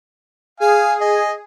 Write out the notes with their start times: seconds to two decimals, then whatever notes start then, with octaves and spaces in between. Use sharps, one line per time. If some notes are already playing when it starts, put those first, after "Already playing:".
0.60 G#4 F5 G#5
1.01 D#5 G#5